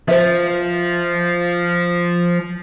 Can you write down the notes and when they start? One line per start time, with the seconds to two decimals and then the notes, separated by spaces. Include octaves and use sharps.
0.08 F3 C5 E5